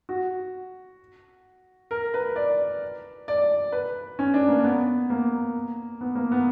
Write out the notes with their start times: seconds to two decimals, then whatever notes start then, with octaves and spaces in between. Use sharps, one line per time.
0.09 F#4
1.91 A#4
2.14 B4
2.36 D5
3.28 D5
3.72 B4
4.19 C#4
4.34 D4
4.48 A#3
4.64 B3
5.10 A#3
6.01 B3
6.15 A#3
6.32 B3